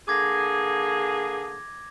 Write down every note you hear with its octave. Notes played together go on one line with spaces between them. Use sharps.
D3 A#3 G#4 D6 G#6 A#6